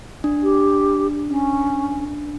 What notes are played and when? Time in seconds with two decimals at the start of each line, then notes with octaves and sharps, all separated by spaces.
0.24 D4
0.43 G4
1.29 C#4